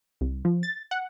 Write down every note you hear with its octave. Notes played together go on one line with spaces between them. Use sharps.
C2
F3
A6
F#5